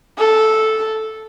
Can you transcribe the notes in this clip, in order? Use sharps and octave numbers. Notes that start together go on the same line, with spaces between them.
A4